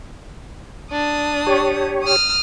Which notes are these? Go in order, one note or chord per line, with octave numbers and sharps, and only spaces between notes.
D4 D#6
G4 C#5
D#6 F6